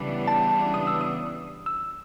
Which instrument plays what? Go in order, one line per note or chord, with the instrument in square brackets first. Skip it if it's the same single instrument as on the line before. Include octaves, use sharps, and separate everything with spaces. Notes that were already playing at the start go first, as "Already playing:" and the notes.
Already playing: [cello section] C#3 E3 G3 B3 D4
[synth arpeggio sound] A5
D#6
E6
D#6
E6